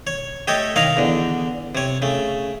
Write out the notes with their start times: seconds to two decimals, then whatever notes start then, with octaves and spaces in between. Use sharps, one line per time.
0.07 C#5
0.48 A3 G4 A4 C#5 D#5
0.76 D#3 C#5 D#5 F5 A#5
0.97 E2 D3
1.75 C3 C#5
2.02 C#3 A3